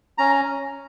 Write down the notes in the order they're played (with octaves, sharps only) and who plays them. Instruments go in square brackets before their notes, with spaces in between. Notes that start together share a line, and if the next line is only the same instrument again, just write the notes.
[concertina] C#4 A#5